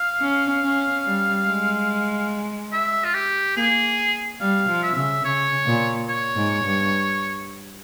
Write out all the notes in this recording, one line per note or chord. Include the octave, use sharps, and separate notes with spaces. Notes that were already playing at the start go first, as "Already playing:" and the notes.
Already playing: F5
C#4
C#4
G3
G#3
E5
F4
G4
A#3 G#4
G3 F5
F3
E5
C#3
C#3 C#5
A#2
C#5
G#2
G2